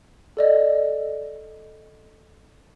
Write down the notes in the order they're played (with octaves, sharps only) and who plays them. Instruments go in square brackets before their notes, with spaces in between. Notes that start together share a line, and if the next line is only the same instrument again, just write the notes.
[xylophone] A4 D5 D#5